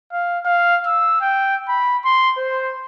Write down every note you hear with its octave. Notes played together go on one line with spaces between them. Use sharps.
F5
F5
E6
G5
B5
C6
C5